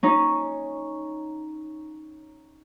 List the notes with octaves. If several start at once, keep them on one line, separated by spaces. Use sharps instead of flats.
C#4 D#4